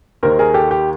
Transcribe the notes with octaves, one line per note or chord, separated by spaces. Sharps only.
D#2 D#3 A#4 C5
G#4 A#4
G4 A4
G4